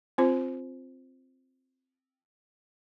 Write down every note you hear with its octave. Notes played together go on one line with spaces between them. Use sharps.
C4 F4 C5